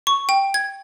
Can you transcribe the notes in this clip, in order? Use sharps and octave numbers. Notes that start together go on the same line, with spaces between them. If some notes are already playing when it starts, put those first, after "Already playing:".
C#6
G5
G#6